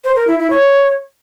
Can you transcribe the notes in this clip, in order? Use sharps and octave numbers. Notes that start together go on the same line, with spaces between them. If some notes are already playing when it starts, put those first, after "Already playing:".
C5
A#4
E4
E4
C#5